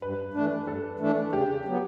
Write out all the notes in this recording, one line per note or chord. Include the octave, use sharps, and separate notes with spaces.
G2 B4
E3 A3 D4
G2 A4
E3 A3 D4
C#3 G4
F#3 B3